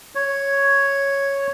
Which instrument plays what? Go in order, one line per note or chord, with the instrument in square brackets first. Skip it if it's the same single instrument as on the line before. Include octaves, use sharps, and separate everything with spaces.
[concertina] C#5